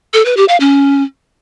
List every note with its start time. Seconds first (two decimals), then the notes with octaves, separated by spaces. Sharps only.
0.14 A4
0.25 B4
0.37 G4
0.48 F5
0.60 C#4